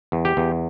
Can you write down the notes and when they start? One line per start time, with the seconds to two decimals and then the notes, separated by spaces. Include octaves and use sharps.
0.12 E2
0.25 G4
0.37 E2